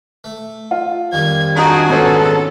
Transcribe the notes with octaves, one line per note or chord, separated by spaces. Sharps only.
A3
F4
F2 D#3 G3 G#6
D4 D#4 F#4 G#4
G#2 B3 C#4 A4